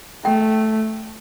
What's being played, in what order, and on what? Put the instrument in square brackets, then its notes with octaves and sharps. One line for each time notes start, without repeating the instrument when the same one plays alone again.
[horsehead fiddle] A3 [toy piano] G5